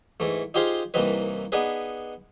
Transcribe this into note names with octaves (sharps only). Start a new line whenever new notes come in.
G#2 E3 A3
D#4 F4 G4 G#4 C5 F5
C2 E3 A#3 C4 D#4 B4
B3 D4 D#4 G#4 B4